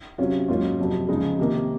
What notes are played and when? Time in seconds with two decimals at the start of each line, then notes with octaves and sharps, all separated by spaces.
0.18 C3 F#3 C#4 F4
0.48 G#2 F#3 A#3 C#4 F4
0.79 F2 C3 F#3
1.08 C#3 F3 G#3 D#4
1.39 C3 D#3 A#3